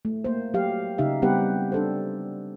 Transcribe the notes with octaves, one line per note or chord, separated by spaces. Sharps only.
A3
A#3 C5
F#3 G4 F5
C#3 D#4 G4 E5 F5
G3 B3 C4 G4 B4 F#5
D4 A4 C5